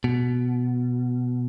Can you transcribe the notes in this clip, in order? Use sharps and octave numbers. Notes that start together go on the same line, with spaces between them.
B2